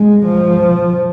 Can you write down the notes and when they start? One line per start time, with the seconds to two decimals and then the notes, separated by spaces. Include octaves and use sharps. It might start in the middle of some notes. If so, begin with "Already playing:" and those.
Already playing: G#3
0.25 F3